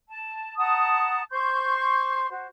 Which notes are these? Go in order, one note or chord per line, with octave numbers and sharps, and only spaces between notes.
A5
F#5 A5 A#5 D#6
C5 C6 C#6 G6
F#4 C5